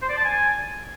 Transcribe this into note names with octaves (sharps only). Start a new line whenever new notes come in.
C5
D5
A5
G#5